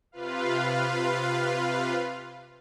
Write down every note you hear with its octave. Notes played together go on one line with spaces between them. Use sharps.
C3 F4 B4 F5